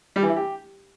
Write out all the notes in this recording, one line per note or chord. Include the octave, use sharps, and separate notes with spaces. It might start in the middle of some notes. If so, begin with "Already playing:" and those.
G3
E3
E4
G4